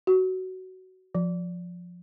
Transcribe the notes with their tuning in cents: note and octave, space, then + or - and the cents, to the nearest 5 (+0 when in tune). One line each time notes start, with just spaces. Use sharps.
F#4 +15
F3 +15